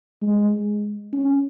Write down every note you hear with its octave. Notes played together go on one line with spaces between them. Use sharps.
G#3
C#4